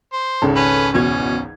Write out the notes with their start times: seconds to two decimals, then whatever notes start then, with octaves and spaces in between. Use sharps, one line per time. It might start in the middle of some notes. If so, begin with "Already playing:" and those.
0.13 C5
0.42 G#1 C#2 C#3 A4
0.56 C#4 B4
0.94 E2 B2 C#4 G#6